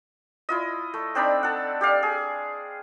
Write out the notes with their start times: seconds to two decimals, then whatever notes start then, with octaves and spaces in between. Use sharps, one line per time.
0.49 E4 F4 D#5
0.94 A3
1.15 C4 D4 D#4 B5
1.43 A4 F#5
1.81 G4 D5 F5
2.03 G#4